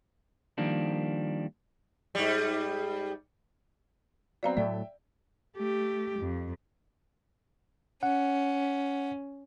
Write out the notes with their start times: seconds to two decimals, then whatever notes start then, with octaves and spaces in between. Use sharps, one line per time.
0.58 D#3 F3 G3 A#3 D4
2.15 G#2 G3
4.43 F#3 B3 C4 D5 F5 A#5
4.57 A2 F#3 A3 D5 E5 G5
5.57 A3 G4
6.20 F2
8.03 C#4 F#5